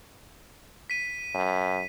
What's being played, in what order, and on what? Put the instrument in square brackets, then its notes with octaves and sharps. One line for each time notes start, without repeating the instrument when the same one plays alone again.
[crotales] B6 D#7
[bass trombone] F#2